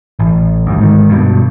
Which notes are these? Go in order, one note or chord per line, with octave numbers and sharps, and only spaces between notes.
A1
D2 G2
G#2 D#3
G2 B2